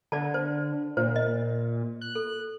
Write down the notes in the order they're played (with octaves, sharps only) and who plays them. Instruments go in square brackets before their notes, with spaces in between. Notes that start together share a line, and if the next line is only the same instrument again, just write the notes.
[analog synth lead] D3 [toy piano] D5 A5
[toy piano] C5
[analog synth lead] A#2 [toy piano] C5
[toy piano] D#5
[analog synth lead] F#6
[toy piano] A4